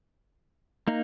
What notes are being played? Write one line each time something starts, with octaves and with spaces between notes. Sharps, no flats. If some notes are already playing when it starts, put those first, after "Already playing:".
A#3 D#4